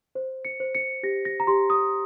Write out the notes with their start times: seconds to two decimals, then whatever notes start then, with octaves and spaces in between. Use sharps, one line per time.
0.15 C5
0.45 C#7
0.60 C5
0.75 C#7
1.03 G4 A#6
1.25 A#6
1.40 A#5
1.47 G4 C6
1.70 D#6